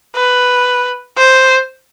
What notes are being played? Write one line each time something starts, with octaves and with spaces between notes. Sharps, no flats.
B4
C5